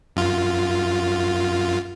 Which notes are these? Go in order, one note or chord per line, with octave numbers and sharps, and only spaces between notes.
F#2 F4